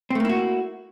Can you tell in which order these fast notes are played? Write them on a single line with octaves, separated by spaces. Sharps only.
C4 A3 A#3 E4 F#4